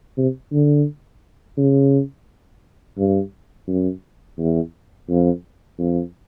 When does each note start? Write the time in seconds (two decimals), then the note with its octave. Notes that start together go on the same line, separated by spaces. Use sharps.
0.17 C3
0.52 D3
1.57 C#3
2.98 G2
3.68 F#2
4.38 E2
5.09 F2
5.79 F2